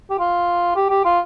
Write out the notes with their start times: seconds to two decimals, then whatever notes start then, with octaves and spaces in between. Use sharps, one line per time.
0.10 G4
0.19 F4
0.76 G4
0.90 G4
1.05 F4